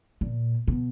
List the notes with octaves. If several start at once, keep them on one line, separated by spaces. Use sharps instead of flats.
A#2
B2